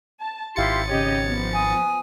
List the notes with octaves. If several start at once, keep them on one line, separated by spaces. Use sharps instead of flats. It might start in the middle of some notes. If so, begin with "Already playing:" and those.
A5
G#1 E4 F4 G4 C6 A6 C#7
C#3 G4 C#5 D#5
F3 B3
G#5 D#6